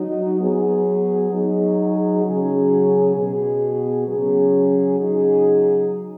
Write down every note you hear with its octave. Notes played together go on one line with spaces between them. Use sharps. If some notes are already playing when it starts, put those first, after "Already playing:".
Already playing: F#3 D#4 F#4
F#3 B3 G#4
F#3 D#4 G#4
C#3 F#3 C#4 G#4
B2 B3 G#4
C#3 F#3 C#4 G#4
C#3 F#3 D#4 G#4